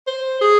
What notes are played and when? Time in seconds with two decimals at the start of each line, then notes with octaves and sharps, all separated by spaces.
0.07 C5
0.41 G#4